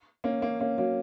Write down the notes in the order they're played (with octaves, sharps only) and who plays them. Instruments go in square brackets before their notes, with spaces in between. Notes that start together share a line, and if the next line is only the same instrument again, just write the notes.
[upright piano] A#3 C#4
A#3 C#4
A#3 C#4
F#3 A#3